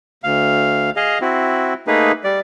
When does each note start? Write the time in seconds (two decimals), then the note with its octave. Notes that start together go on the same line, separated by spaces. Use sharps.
0.24 D2 F5
0.96 G#4 D#5 F5
1.21 C4 E4 F#4
1.87 A3 A#3 D#4 G#4 B4
2.24 G3 D5